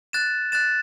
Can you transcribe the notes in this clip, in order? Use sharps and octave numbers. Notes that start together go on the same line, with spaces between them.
F#6 A6 E7
F#6 A6 E7